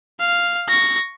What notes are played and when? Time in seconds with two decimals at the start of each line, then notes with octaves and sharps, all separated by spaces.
0.20 F5
0.68 C#6 A#6